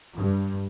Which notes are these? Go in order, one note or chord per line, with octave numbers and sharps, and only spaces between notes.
G2